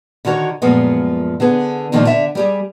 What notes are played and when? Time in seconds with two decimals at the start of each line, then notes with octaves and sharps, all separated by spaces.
0.25 D3 D#3 F#4 C#5
0.62 F#2 A#2 F3 G#3 B3
1.40 D3 B3 G#4
1.92 A#2 D3 D#3 F3 G#3 D#4
2.05 D3 E5
2.35 G3 G4 G#4